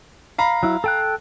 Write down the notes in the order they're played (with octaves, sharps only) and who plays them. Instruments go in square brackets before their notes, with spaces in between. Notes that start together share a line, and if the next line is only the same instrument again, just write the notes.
[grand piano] F5 A#5 B5
[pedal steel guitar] F#3 E4
A4 G5 F#6